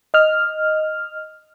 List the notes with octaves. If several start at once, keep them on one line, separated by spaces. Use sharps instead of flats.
D#5 F6